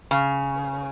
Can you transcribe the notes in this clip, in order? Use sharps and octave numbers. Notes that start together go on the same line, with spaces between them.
C#3